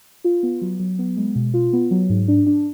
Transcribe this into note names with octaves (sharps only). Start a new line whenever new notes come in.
F4
B3
F#3
F#3
B3
G#3
B2
F4
B3
F#3
G#2
D4
D4